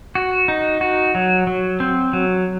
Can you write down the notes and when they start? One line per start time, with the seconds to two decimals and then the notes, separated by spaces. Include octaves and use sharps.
0.15 F#4
0.48 D#4
0.81 F#4
1.15 F#3
1.47 F#3
1.80 C4
2.13 F#3